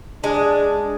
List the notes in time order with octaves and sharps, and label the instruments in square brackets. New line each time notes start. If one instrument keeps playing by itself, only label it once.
[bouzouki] G#3 [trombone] D4